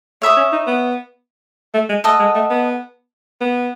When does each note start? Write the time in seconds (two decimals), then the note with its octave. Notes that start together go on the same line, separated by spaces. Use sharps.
0.22 A3 C#5 E5 B5 D#6
0.37 C#4
0.52 D#4
0.67 B3
1.74 A3
1.89 G#3
2.04 A3 A4 D#5 F#5
2.20 G#3
2.35 A3
2.50 B3
3.41 B3